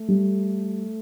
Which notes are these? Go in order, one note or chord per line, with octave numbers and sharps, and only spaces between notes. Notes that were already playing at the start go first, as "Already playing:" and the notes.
Already playing: A3
G3